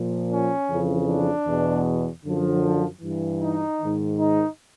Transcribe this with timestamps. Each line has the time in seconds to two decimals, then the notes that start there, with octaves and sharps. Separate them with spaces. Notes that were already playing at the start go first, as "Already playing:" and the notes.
Already playing: A#2 F3
0.30 C#4
0.69 F2 C#3 E3
1.08 D4
1.46 E2 B2
2.24 F#2 D3 F3
3.01 G2 E3
3.40 D#4
3.80 G#2 D#3
4.18 D#4